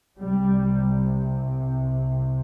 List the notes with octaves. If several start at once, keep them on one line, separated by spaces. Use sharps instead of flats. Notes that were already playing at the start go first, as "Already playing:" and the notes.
C2 C3 G3